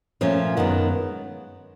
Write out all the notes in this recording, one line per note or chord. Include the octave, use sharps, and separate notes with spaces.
A#2 F3 A3 C#4 F4
F#2 D#3 G#3 B3